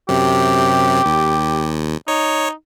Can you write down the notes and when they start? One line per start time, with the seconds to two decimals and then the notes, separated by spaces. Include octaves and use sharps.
0.09 F#2 C3 G4
1.06 D#2
2.08 D#4 C#5